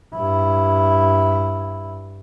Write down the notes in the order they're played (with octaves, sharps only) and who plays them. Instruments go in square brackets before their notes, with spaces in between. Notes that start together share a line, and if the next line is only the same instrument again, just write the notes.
[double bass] G2 E4